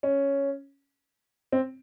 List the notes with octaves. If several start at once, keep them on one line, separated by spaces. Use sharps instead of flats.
C#4
C4